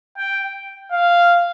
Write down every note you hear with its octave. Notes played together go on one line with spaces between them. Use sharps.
G5
F5